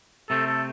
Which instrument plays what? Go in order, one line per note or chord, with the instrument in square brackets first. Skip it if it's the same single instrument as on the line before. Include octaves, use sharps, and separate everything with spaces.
[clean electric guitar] C3 A3 C4 [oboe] A4
[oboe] A4